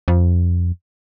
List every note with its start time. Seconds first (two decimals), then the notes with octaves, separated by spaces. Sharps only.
0.08 F2